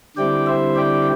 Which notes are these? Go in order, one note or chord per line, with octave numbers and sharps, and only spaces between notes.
D3 G3 C4 E4 D5 G5
C5 E5
D5 G5